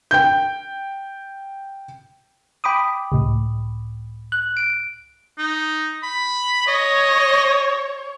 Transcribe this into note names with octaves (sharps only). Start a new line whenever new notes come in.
G5 G6
G5 B5 D6 D#6
C#2 A2
F#6
D7
D#4
B5
C#5 D#5